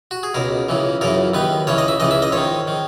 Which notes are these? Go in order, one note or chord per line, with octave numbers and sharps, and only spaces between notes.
F#4
G#4
C#2 B2 A#4
C#2 C#3 E3
F#2 C#3 E3 A#4
D#2 D#3 B4
C#2 C#3 E3 C#5
D#5
E5
C#2 C#3 E3 D#5
E5
D#5
G#2 D#3 C#5
D#3